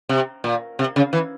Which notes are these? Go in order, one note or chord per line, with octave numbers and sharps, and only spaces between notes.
C3
A#2
C3
C#3
E3